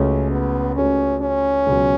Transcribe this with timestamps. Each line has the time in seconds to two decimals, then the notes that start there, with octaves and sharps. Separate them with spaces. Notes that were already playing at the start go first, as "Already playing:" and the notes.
Already playing: C#2 C#3 A3 C#4 F#4 C#5
0.32 B3
0.76 C#2 C#3 A3 C#4 F#4 C#5
1.22 C#4
1.66 C#2 B2 F#3